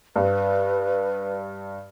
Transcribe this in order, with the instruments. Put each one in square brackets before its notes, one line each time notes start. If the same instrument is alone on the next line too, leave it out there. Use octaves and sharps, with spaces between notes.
[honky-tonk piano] G2 [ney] B4